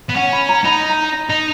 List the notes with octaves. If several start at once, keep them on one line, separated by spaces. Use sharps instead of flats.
B3
C#4 F#5
B5
A#5
D#4 B5
A#5
D#4